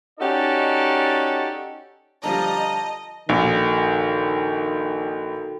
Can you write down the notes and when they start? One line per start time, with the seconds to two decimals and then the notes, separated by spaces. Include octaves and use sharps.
0.20 C#4 D#4 F#4 G4 A4 D5
2.23 D3 F3 G3 D#5 A5 A#5
3.29 A#1 D#3 F#4 A4 G5